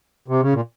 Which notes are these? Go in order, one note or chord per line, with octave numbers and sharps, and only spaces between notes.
C3
C#3
A#2